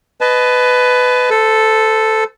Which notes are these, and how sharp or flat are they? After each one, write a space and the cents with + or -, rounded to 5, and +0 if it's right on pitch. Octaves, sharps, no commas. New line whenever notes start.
B4 +15 D#5 +0 A5 -25
A4 +0 C5 -35